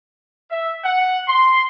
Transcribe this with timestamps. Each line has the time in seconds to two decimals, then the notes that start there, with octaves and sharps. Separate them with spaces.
0.51 E5
0.85 F#5
1.28 C6